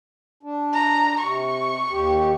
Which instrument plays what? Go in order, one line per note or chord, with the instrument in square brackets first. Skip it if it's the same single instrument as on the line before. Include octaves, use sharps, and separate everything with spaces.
[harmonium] D4
[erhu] A#5
[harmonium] C3 [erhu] C#6
[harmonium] D#2 G4